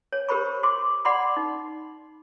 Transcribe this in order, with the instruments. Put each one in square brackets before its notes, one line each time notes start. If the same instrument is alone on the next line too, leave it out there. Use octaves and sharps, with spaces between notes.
[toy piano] C#5
G4 A#4 C5 B5 C#6
C6 D6
D5 F#5 B5 C6 D6
D#4